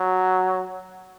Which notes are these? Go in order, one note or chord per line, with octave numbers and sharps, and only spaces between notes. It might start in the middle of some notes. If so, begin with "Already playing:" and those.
Already playing: F#3